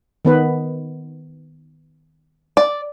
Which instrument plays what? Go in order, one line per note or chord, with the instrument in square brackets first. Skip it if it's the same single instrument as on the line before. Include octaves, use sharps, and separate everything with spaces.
[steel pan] D#3 B3 B4
[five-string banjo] D5